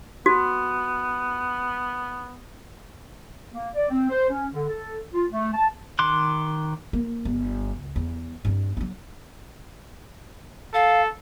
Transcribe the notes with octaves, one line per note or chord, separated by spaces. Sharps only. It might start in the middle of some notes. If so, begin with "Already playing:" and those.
B3 F#4
A#3
D5
C4
C5
C#4
D3
A4
F4
A3
A5
D#3 C6 D6 F#6
A#3
G1
C#2
E2
G2 C4
F#3 D4
A4 F5